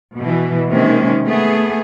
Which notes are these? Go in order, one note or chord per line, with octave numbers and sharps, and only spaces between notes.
B2 E3
C3 D#3 G#3 A#3 C#4
A3 B3 G#4